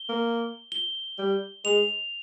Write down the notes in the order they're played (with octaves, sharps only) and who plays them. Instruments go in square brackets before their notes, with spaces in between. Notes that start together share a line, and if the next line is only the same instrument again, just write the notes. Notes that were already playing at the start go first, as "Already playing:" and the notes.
Already playing: [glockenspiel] G7
[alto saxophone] A#3
[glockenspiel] G7
[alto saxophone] G3
[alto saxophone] G#3 [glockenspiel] F7